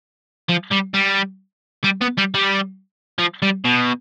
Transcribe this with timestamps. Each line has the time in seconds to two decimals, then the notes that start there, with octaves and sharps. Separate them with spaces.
0.49 F3
0.72 G3
0.94 G3
1.84 G3
2.02 B3
2.18 G3
2.35 G3
3.19 F3
3.42 G3
3.65 B2